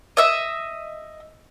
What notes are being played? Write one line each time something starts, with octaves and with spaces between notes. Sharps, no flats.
D#5 E5 E6